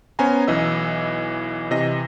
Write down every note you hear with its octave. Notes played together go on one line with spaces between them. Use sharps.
B3 C#4 C5 G#5 A#5
B1 E3 D#5 E6
C3 E3 D#5 A#6